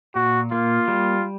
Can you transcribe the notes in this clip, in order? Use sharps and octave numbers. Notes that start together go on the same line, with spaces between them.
A#2 F#4
A#3 F4
G3